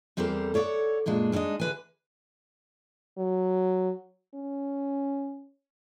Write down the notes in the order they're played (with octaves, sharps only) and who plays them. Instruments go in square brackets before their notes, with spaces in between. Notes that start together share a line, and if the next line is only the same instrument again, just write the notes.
[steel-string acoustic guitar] E2 G3 C4 A4 A#4 C5
A4 C#5 D5 E5 F#5
F#2 A#2 G#3 D4
G#3 C4 D4 D#4 D#5
D3 B4 G#5
[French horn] F#3
C#4